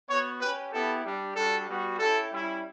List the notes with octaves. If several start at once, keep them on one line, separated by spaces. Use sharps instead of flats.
B3 F#4 C#5
C#4 G4 B4
B3 E4 G4 A4
G3 D4 G4
G3 D4 F#4 A4
G3 B3 F#4
C#4 E4 G4 A4
G3 C#4 E4